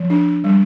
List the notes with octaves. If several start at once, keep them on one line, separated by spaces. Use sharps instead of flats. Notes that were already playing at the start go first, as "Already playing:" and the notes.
Already playing: F3
D4
G3